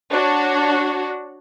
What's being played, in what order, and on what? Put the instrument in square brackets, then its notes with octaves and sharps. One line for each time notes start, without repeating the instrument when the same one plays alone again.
[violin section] D4 F#4 C#5